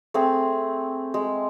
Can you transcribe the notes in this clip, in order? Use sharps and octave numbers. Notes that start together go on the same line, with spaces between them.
A3 C4 G#4
G#3